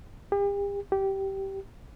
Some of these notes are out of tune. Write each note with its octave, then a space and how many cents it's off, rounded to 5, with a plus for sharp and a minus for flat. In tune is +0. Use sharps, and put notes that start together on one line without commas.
G4 +40
G4 -15